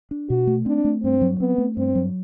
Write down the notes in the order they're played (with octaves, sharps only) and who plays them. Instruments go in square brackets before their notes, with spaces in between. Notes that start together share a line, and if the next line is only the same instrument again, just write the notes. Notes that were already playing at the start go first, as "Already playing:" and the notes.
[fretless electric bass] D4
[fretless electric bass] B2 [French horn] F#4
[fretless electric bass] A3
[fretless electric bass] C4 [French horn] D4
[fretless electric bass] A3
[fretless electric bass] G2 [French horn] C4
[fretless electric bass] F#3
[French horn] B3 [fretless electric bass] C4
[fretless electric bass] A3
[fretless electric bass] G2 [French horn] C4
[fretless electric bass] F#3